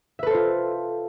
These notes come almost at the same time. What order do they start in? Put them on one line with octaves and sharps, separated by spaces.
E5 B4 A4 C5 F4